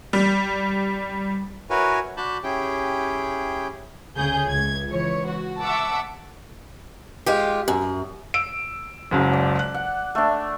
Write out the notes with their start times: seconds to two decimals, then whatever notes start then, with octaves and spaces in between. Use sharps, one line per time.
0.13 G3
1.70 E4 F#4 A#4 B4 C#5 G#5
2.17 D4 F#4 A5 B5 G6
2.43 C#4 E4 G4 G#4 G5
4.17 D2 C#3 G#4 G6
4.47 C#2 A3 G#6
4.88 C#2 E3 C#5
5.26 F#4
5.62 E5 F#5 A5 C#6 D6 E6
7.26 G#3 F4 G4
7.68 F#2
8.34 E6 D7
9.11 F#1 C#2 F#3
9.33 D5
9.59 F#6
9.74 F#5
10.15 A3 D4